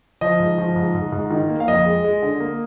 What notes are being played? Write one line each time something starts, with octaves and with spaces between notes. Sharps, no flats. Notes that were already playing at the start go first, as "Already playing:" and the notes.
F3 D#5
G#2
F3
G#2
G#2
G#2
D#3
A#3
F5
F2 D#5
G#3
G#3
D3
A#3